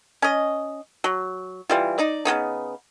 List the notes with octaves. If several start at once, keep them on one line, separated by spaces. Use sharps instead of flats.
C#4 D#5
F#3
E3 G3 F4
D#4 D5
C#3 F#3 B3 D#4